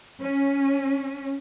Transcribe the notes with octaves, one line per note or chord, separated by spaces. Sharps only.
C#4